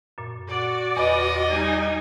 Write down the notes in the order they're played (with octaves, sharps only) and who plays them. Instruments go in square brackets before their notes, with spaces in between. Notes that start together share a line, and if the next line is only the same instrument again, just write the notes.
[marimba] F#2 A#2
[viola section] F#4 D5
[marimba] E2 B4 B5 [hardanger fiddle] D#5
[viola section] G3 D#4 G#5